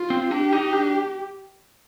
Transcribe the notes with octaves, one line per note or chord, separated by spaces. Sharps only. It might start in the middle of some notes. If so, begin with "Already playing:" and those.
Already playing: F4
C4
D4 G4
D#4
D4